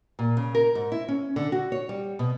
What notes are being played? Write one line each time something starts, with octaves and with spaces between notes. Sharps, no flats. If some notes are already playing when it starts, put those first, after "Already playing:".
A#2
C#3
A#4
G#2
E4
C#4
D3
F#4
C#5
G3
B2